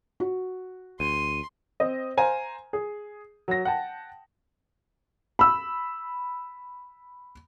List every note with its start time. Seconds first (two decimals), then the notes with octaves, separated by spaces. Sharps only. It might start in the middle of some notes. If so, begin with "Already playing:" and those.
0.20 F#4
1.00 D2 C6 D#7
1.80 C4 D#5
2.17 C5 F5 G#5 A#5
2.73 G#4
3.48 F#3 A#6
3.65 F#5 G5 A5
5.39 B5 E6